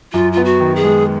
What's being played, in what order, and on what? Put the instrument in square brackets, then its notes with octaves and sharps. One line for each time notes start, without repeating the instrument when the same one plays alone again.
[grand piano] F#2 [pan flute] F4
[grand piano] B3 [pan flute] F4
[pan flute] F#4
[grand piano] D#3
[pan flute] G#4
[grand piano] G#3